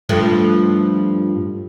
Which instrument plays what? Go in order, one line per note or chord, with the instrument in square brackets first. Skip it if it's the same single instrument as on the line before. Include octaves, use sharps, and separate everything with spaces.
[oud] G2 F3 A3